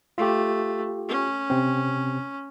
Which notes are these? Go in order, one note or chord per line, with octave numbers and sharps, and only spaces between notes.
A3 F4 G4
C#4
C3 C4